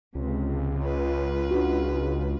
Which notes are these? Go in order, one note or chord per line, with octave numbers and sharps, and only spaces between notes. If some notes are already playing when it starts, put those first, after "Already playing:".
C#2 C3
F4 B4
D4 F#4